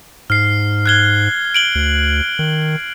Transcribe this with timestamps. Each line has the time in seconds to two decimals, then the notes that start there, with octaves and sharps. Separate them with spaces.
0.30 G#2 F6 C7
0.86 F#6 G#6 G7
1.54 D7 F#7 G7
1.75 D2
2.39 D#3